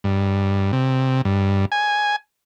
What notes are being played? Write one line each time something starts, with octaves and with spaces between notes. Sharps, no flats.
G2
C3
G2
G#5